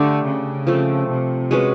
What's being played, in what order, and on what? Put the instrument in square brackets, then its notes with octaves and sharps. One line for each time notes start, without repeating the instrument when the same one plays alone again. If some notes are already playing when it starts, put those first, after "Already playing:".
Already playing: [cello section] D3 [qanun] A3 D4 G4
[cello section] C#3
[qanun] F3 A3 C4
[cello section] C3
[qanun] G#3 C#4 F#4 B4